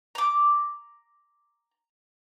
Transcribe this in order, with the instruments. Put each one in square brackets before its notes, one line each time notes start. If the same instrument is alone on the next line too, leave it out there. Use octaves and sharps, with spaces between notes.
[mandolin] A#5 D6